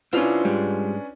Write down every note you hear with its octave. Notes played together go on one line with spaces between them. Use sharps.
C#4 D4 E4 F4 B4 C5
G#2 G3 G#3